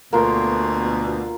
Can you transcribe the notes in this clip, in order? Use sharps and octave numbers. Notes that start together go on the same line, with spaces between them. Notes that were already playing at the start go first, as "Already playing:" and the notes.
D2 B2 A#3 F4